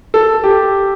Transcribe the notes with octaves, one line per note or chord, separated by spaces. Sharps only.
A4
G4